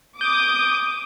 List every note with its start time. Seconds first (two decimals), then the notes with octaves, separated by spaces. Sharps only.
0.21 D6 D#6 G6